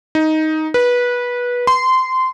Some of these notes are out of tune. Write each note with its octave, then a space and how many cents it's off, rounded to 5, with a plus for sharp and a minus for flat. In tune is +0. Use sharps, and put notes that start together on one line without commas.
D#4 +10
B4 -20
C6 -20